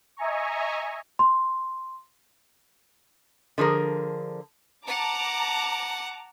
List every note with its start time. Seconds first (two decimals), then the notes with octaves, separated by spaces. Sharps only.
0.17 D#5 E5 G#5 A#5 C#6
1.19 C6
3.58 D3 F3 G#4 A#4
4.87 F#5 A5 A#5 D6